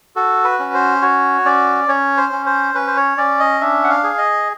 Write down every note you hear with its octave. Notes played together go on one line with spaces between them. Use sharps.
F#4 A4
B4
C#4
C5
F#4 C#5
C#4 D5
C#4 C#5
C5
C#4
C5
C#4 B4
C5
C#5
C#4 D5
D#5
D4 E5
F#5
F5
G#4
D#5